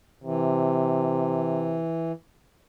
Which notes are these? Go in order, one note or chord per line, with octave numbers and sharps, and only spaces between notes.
C3 E3